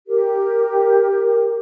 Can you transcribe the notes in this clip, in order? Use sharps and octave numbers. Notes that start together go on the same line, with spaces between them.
G4 A#4